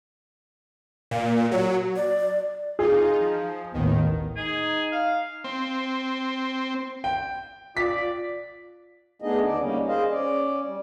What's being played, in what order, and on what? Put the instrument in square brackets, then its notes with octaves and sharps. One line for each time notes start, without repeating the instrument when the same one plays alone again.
[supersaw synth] A#2
F#3
[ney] D5
[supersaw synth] D#4 F4 [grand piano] G#4
[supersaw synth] F3
[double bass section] A1 D#2 B3 [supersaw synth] D#3
[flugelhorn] D#4 [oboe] G#4
[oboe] F5
[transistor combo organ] C4
[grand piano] G5
[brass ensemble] F4 D5 [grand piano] B6
[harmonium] A3 B3 D4 D#4 G#4 D#5
D#2 D3 D5
G3 A#3 C#4 D#4
G#4 C5 D#5 F5
C#4 D5
G3